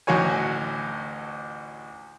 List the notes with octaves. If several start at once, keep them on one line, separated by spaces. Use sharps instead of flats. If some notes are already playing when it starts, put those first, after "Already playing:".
A1 D2 D#4 F#4 C#5 G#5